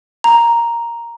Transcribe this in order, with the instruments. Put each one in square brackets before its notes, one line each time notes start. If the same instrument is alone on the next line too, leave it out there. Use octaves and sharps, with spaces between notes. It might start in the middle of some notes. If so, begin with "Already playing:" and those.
[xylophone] A#5